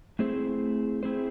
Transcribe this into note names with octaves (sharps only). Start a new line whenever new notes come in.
A3 C4 E4 G#4 C5
A3 C4 E4 G#4 C5